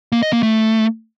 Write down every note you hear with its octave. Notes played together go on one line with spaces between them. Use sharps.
A#3
D#5
A#3
A3